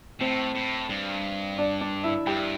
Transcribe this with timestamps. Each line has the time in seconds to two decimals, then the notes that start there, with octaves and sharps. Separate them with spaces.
0.20 A2 C4 C5
0.55 A2
0.89 G2
1.58 D4 D5
1.81 D4 D5
2.04 E4 E5
2.26 G2 G4 G5